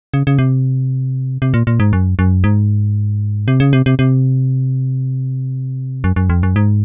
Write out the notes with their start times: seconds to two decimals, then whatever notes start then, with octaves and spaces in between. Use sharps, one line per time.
0.14 C#3
0.27 C#3
0.39 C3
1.42 C3
1.54 A#2
1.67 A#2
1.80 G#2
1.93 F#2
2.19 F#2
2.44 G#2
3.48 C3
3.60 C#3
3.73 C3
3.86 C3
3.99 C3
6.04 F#2
6.16 F#2
6.30 F2
6.43 F#2
6.56 G#2